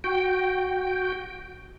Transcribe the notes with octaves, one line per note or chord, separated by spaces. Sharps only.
F#4 G5